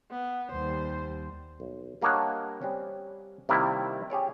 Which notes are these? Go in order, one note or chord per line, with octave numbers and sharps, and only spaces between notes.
B3
D#2 G3 C5
B1
G3 A#3 D4 C#5 D#5 F#5
G3 C4 C#4
C3 D#3 G3 A#3 E4
G4 G#4 C#5 D5